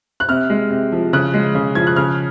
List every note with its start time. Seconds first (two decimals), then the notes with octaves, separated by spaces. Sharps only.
0.20 F#6
0.29 C3 F6
0.50 G#3
0.70 C3
0.92 F3
1.13 C#3 F#6
1.34 G#3
1.55 C#3
1.75 F3 G#6
1.87 F#6
1.96 C#3 F6